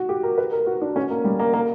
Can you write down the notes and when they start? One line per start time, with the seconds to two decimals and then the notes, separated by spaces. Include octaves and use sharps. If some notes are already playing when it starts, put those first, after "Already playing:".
Already playing: F#4
0.09 G4
0.23 A#4
0.38 B4
0.53 A#4
0.66 F#4
0.81 D4
0.96 C#4
1.10 A#3
1.24 G3
1.39 A#3
1.54 A#3